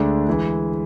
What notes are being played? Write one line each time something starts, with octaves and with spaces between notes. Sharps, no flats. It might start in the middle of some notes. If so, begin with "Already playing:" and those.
Already playing: D2 D3 G#3 D4
E3 G#3